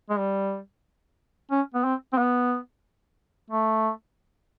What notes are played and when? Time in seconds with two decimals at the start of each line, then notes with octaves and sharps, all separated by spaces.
0.10 G#3
0.19 G3
1.51 C#4
1.74 B3
1.84 C4
2.13 C4
2.17 B3
3.50 A3